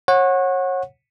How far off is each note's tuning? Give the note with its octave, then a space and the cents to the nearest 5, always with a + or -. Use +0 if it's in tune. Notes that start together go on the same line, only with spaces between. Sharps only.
C#5 -30 F#5 -15